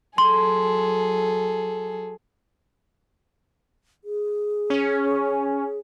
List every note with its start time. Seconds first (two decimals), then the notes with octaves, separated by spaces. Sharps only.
0.18 F#3 G#4 A4 C6
4.04 G#4
4.70 C#4